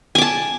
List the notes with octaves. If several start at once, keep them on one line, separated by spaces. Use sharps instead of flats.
G#5 A5 D6